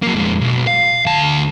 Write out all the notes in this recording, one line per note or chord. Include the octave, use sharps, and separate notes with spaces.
F#3 A#3
F2 G#3
B1
F5
D2 A5